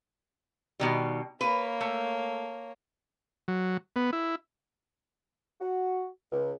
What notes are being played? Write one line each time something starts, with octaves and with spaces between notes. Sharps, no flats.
B2 D#3 G3
A#3 B4 C#5
A3
F#3
B3
E4
F#4
C#2